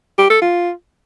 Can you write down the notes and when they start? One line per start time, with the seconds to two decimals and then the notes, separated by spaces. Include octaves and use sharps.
0.18 G4
0.30 A4
0.42 F4